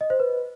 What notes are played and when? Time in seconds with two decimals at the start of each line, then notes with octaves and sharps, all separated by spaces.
0.01 D#5
0.10 C5
0.20 B4